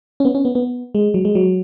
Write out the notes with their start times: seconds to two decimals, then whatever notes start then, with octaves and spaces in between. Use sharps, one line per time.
0.20 C#4
0.25 B3
0.35 C#4
0.45 B3
0.55 B3
0.95 G#3
1.14 F#3
1.25 G#3
1.35 F#3